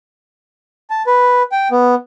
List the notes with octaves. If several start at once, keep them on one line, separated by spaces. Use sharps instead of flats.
A5
B4
G5
B3